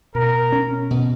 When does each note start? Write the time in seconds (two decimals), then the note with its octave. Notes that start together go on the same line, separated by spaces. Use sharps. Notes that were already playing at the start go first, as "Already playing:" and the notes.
0.15 B2 A#4
0.52 C#4
0.91 B2